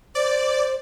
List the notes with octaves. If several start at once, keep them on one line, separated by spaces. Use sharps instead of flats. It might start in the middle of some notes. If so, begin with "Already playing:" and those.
C5 D5